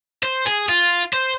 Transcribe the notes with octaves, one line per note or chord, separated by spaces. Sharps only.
C5
G#4
F4
C5